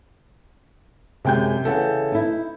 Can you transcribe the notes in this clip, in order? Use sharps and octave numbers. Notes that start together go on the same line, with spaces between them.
F#2 C3 G#3 G5 G6
C#3 E3 A4 F#5
D#4 E4